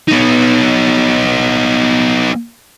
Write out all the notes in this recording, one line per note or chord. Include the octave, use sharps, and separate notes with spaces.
B3 D#4